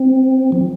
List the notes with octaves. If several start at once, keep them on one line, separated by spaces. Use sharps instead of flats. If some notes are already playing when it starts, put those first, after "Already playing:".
Already playing: C4
F3